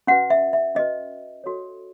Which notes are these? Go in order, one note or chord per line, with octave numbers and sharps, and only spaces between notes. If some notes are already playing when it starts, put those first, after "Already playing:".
C#4 F#4 B4 F#5
E5
E5
C#4 F#4 B4 D#5
F#4 A4 C#5